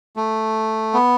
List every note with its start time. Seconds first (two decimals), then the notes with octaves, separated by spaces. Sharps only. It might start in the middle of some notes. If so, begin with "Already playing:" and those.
0.17 A3
0.94 B3